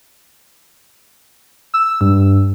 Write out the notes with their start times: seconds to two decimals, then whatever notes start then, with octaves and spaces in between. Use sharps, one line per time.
1.74 E6
2.01 G2